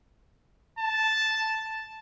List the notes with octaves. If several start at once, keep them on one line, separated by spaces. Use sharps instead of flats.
A5